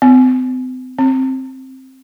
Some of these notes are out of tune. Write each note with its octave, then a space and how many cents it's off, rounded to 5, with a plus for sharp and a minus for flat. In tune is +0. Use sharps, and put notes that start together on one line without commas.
C4 -40
C4 +10